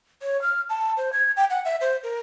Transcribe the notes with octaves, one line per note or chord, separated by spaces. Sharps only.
C#5
F6
A5
C5
G#6
G5
F#5
E5
C5
A#4